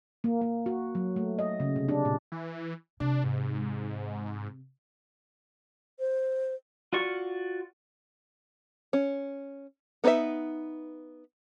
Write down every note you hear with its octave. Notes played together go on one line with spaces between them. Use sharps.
A#3
A#3
F#4
F#3
A3
D#5
C#3
C3
D4
A#2
E3
C3 D4
G#2
C5
F4 F#4 D5 C#6
C#4
B3 D#4 B4 D#5 E5